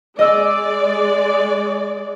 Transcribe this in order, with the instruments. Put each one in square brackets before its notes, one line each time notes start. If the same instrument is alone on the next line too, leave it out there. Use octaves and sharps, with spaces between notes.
[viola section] G#3 D5 [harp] D#5 E6